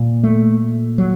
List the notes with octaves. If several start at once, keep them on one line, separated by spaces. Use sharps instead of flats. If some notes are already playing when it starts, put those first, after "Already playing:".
Already playing: A#2
A3
F#3